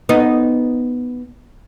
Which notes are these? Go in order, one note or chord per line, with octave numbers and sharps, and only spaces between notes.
B3 D#4